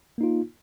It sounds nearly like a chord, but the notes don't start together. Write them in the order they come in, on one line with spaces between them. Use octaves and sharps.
A#3 D#4 F4